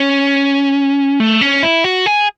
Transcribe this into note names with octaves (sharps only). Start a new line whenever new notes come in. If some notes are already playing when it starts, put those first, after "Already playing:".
Already playing: C#4
A3
C#4
E4
F#4
G#4